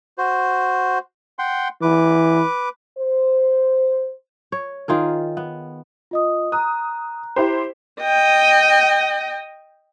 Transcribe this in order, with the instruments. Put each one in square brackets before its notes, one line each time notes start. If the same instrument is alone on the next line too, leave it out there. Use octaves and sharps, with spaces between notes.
[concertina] F#4 C5
F#5 G5 C6
[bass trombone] E3 [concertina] B4 D6
[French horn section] C5
[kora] C#5
D#3 F4 G#4 A#4
B3
[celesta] F4 D#5 D#6
[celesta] A#5 F#6 [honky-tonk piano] D#6
[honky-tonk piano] E4 G4 C5
[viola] D#5 G5